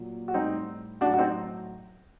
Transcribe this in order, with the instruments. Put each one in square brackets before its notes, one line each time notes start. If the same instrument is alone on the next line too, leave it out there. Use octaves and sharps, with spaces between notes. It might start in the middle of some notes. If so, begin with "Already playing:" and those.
Already playing: [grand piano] A#2 F#3
F#4
A2 G3 C4 D#4
A2 D4 F#4
F#3
F#4
C4 D#4